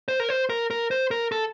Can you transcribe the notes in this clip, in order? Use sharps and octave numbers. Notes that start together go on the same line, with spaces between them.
C5
A#4
C5
A#4
A#4
C5
A#4
A4